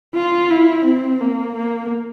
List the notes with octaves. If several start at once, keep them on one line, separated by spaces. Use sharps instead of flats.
F4
E4
C4
A#3
A#3